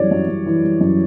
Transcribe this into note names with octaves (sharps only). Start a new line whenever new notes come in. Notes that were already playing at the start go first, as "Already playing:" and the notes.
Already playing: F#2 E3 G3 C#5 D5
F#2
F#2
E3
G3
F#2